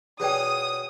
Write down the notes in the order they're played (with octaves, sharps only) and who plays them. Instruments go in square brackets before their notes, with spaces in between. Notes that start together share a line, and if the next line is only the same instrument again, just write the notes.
[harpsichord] B2 C#4 [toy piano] G#4 D5 G5 [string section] D#6